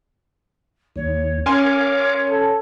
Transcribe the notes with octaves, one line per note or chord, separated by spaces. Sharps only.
D#2 C#5
C#4 A#4 C#5 F5 G#5 C6 D6
A4